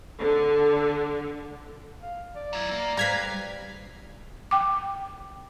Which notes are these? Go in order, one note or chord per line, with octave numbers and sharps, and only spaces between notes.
D3
F5
D5
F#3 E4
A#3
G3 B4 F5 A#5 G#6 B6
G5 D6